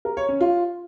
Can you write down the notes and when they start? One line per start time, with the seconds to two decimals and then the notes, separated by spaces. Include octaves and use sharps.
0.05 A#4
0.17 C#5
0.29 C#4
0.41 F4